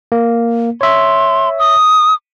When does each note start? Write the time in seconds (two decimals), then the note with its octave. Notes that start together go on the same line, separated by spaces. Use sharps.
0.12 A#3
0.81 C#5 E5 C6
1.59 D#6